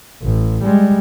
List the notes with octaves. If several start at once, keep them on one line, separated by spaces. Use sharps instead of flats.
A1
G3 G#3